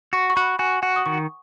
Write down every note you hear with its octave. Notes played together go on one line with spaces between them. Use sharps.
F#4 C#6
C#6
F#4 B5
F#4 G#5
F#4 F#5
D#6
D#3 C#6